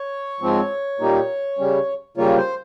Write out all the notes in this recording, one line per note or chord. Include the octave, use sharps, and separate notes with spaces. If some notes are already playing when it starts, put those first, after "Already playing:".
Already playing: C#5
G#2 F3 C4
A#2 G3 A#3 D#4
C#3 G3 C#4
C#3 G3 A#3 F4 C#5
C5